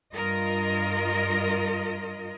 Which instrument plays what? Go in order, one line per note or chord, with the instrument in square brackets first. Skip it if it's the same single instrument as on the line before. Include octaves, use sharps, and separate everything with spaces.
[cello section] G2 F4 A#4 D#5